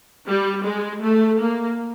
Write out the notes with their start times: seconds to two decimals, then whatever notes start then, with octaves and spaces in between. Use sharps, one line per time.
0.27 G3
0.65 G#3
1.03 A3
1.41 A#3